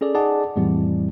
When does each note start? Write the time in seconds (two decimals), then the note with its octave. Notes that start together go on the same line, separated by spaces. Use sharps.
0.01 C#4 G#4 A4 D5
0.15 D#4 G#4 D5 D#5 F#5 A5
0.56 F2 A2 E3 G3 C4 E4